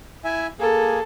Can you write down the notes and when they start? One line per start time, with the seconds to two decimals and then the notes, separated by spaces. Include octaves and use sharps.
0.24 E4 E5 G#5
0.60 A#3 G#4 A4